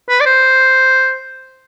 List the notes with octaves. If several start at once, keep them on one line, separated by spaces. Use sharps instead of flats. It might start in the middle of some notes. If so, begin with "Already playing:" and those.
B4
D5
C5